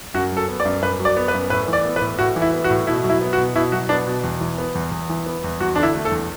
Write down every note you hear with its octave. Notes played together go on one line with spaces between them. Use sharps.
F#2 F#4
F#3
A4
B3
D5
F#2
F#2 B4
F#3
D5
B3
B4
F#2
A2 B4
E3
D5
B3
B4
A2
A2 F#4
E3
E4
B3
F#4
A2
B2 E4
F#3
E4
B3
F#4
B2
B2 E4
F#3 F#4
B3 D4
B2
E2
E3
B3
E2
E2
E3
B3
E2
E2 F#4
D3 D4
E4
A3
A4
E2